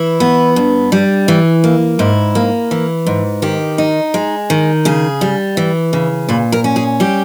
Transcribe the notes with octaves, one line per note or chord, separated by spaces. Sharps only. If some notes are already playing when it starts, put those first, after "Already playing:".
Already playing: E3 E4
B3
G2
G3
E3
A#3
G#2 E4
A#3
E3
G#2
D#3 G4
D#4
G#3
D#3
C#3 G#4
G3
E3
C#3
A#2 B4
A#4
C#4
G#4
G3 G4